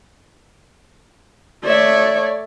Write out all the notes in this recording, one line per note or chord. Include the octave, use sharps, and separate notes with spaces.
A3 C#5 D5 E5